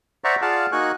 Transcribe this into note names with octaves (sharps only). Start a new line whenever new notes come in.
C5 D5 E5 F#5 A#5 C#6
F4 G#4 D5 F5 F#5 A5
A#3 D#4 F#4 G#5 C#6 F#6